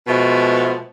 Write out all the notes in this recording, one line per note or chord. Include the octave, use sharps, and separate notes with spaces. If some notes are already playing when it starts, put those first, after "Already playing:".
B2 F3 G#3 A3 B3